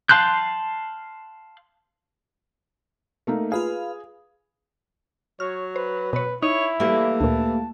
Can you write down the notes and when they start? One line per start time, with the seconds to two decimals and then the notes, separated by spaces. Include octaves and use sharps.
0.09 F5 A5 C6 F#6 G6
3.27 A3 A#3 D#4
3.52 F4 G#4 B4 F5
5.40 F#3 C#5 F6
5.76 B4 C5
6.13 B2 B4 C#5
6.42 D#4 E4 C#5
6.80 E3 G3 A3 A#3
7.21 D2 A#2 A5